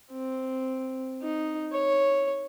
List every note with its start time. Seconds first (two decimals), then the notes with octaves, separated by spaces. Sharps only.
0.11 C4
1.22 D#4
1.72 C#5